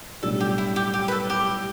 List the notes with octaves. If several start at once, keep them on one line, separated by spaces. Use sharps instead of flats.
B1 A2 G3 D4 A4
G4
E4
G4
G4
B4
A4
G4